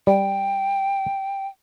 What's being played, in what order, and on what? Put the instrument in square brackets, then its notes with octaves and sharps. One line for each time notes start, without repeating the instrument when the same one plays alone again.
[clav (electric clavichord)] G3 [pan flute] G5